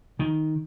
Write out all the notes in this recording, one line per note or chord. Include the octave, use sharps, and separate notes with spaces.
D#3